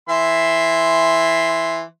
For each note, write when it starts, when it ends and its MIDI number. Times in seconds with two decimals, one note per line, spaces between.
0.09 1.82 52
0.09 1.82 76
0.09 1.82 84